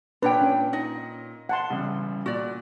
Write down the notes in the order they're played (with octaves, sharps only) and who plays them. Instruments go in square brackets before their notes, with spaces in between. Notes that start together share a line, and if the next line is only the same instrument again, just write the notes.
[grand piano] A#2 [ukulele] D4 C#5 G5 [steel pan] B4
[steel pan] C#4
[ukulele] D#4 D#5
[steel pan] F#5 A5 C6
[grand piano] A1 C#3 G3
[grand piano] A#2 [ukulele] F#4 D5